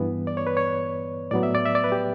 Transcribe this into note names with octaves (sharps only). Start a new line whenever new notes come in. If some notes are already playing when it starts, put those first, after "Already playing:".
Already playing: G2 E3 B3
D5
C#5
B4
C#5
A2 F#3 B3 D5
E5
D5
E5
D5
B4
G4